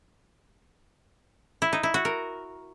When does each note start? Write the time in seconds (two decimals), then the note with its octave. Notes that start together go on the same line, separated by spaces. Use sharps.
1.62 E4
1.73 D#4
1.83 E4
1.94 F#4
2.05 A#4